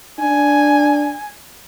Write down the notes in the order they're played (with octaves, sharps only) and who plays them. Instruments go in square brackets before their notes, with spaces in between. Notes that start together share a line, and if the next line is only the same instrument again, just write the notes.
[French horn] D4 [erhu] G#5